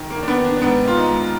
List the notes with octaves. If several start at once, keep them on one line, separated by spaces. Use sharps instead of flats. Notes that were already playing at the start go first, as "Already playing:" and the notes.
Already playing: D#3
A#3
D#3
D4
B3
D#3
D4
D4
G#2 B3
D#3 F4
D#4
G#2